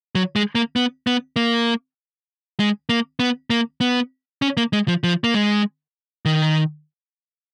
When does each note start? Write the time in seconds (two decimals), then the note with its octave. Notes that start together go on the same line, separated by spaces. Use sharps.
0.15 F#3
0.36 G#3
0.55 A#3
0.76 B3
1.07 B3
1.36 A#3
2.60 G#3
2.89 A#3
3.19 B3
3.50 A#3
3.81 B3
4.42 C#4
4.57 A#3
4.73 G#3
4.88 F3
5.04 F3
5.24 A#3
5.34 G#3
6.25 D#3